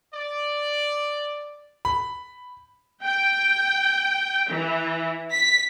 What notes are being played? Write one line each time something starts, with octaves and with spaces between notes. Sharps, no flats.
D5
B5
G5
E3
B6